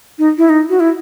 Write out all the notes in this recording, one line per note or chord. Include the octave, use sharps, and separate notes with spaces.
D#4
E4
D#4
F#4
E4